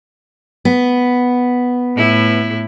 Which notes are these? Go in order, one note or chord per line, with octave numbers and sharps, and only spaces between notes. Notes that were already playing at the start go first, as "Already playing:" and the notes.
B3
A2 E4